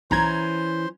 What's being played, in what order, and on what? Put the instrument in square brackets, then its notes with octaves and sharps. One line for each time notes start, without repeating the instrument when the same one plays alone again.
[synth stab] B1 A#5 G#6 [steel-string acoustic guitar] E3 C#4 [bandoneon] C5 C6